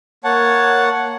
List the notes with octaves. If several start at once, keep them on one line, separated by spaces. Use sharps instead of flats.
A#3 C#5 F#5 A5